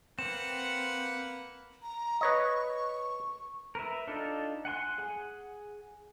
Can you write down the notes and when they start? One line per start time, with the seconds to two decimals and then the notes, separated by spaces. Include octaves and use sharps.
0.19 A#3 C4 B4 F5 F#5 E7
1.82 A#5
2.21 B4 C#5 D#5 C#6
3.75 A#4 B4 E5
4.07 D4 D#4 F4 A4
4.65 F#5 G#5 C6 F#6
4.98 G#4 F#5 G#5